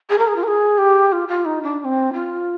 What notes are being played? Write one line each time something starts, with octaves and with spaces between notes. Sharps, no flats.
G#4
A#4
G#4
F4
A#4
G#4
G4
F4
F4
D#4
D4
D4
C4
F4